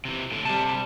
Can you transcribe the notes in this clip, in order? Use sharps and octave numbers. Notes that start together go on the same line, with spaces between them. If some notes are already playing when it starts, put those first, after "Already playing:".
C3 E3
A2 D3
C3 G3 A5